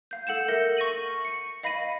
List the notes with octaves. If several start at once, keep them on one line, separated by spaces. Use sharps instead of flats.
F5 G6
A4 F#5 G6 E7
A#4 E5 G6 A#6 C#7
C#6 A#6 D#7 F#7
C#7
D#5 F5 B5 A#6 B6 D#7